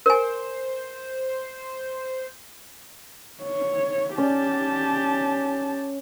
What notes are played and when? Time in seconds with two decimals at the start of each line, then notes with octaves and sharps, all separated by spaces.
0.06 A#4 C5 G#5
3.42 C#5
4.18 C#4 G4 D5 A5